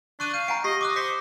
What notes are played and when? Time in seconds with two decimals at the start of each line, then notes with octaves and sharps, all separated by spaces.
0.20 D4 C#6 F#6 D#7
0.34 F5 G6 D#7
0.48 F#5 G#5 A#5 D7
0.64 G4 D#5 A#6 C7
0.81 D#5 D6 D#6 F#6
0.96 C5 D6 B6 C#7